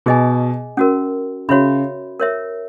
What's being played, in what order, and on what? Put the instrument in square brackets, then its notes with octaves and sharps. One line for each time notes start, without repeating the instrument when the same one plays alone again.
[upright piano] B2 [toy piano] G#4 D#5 G#5
[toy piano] C#4 F#4 A#4
[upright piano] C#3 [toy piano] F#4 C#5 E5 B5
[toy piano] A#4 C#5 E5